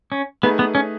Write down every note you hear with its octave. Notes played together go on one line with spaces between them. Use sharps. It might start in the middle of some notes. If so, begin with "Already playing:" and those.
C#4
A3 B3 D#4 G#4 B4
B3
C#4